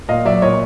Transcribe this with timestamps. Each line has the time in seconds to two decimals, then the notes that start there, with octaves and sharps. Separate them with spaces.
0.09 A#2 D#5 F5
0.25 F#3 D5 E5
0.42 A#2 C#5 D#5